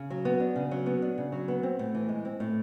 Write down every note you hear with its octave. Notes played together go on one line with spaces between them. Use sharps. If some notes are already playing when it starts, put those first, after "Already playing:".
Already playing: C#3
F#3
B3
D4
C#3
F#3
B3
D4
C#3
F#3
B3
C4
A2
E3
G#3
C4
A2